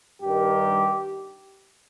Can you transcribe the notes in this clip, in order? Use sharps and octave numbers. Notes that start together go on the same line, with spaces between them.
G2 D#3 G4